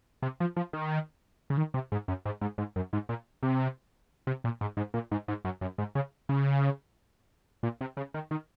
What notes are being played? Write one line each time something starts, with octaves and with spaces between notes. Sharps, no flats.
C3
F3
F3
D#3
C#3
D#3
C3
G#2
F#2
G#2
G#2
G#2
F#2
G#2
A#2
C3
C3
A#2
G#2
G#2
A#2
G#2
G#2
F#2
F#2
G#2
C#3
C#3
A#2
C3
C#3
D#3
D#3